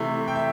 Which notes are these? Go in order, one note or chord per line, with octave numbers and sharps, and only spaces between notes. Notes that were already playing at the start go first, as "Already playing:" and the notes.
Already playing: C3 E3 A3 E5
G5
E5